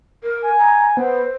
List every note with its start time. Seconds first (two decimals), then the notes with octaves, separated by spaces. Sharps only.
0.23 A#4
0.42 G#5
0.59 A#5
0.97 B3 C5